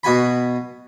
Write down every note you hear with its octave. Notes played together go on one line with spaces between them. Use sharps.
B2 F#4 G#5 B5